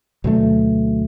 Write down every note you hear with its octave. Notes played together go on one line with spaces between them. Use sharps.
D2 B2 F#3 A3